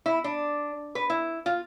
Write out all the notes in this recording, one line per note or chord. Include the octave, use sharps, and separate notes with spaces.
E4
D4
B4
E4
F4